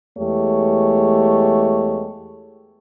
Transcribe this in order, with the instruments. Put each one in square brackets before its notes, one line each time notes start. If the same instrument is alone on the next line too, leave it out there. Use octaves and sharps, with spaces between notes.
[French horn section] E2 G#3 A3 G4 C#5